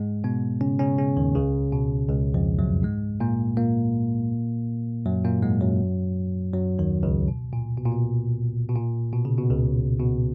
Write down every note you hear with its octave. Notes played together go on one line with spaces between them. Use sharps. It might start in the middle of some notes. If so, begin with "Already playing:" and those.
Already playing: G#2 G#3
B2 B3
C#3 C#4
C#3 C#4
C#3 C#4
D#2 D#3
C#2 C#3
B2
C#2 C#3
F2 F3
F#2 F#3
G#2 G#3
A#2 A#3
A#2 A#3
F#2 F#3
A#2 A#3
G#2 G#3
F#2 F#3
F#2 F#3
D#2 D#3
C#2 C#3
B2
A#2
B2
A#2
B2
B2
A#2
B2
C#3
B2
C#2 C#3
B2